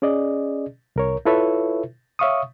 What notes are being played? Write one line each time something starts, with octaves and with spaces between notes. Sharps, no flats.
C#4 G#4 D5 D#5
C2 A#4 C#5
E4 F4 A4 B4 C#5 E5
C#5 E5 F5 C#6 D#6